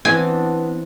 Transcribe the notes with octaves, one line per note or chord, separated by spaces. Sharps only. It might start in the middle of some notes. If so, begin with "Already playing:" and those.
E3 B3 C4 D4 G#5